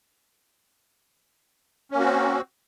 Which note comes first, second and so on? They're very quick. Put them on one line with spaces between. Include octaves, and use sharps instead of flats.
C#4 A#3 F#4 C4